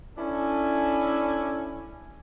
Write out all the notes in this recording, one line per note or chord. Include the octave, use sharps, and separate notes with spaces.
C#4 D4 E4 A4 G#5